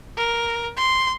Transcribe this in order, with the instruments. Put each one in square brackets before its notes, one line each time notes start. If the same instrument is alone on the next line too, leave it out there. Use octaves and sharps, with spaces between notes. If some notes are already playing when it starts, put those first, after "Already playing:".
[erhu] A#4
C6